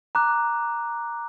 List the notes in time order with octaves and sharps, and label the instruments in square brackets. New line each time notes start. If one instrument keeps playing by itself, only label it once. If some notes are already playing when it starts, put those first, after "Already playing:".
[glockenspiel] A#5 D6 F#6